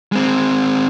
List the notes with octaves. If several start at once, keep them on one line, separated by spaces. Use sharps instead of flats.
G#3 C4